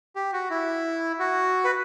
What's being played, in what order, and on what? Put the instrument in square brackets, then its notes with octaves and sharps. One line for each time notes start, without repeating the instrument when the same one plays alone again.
[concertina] G4
F#4
E4
F#4
B4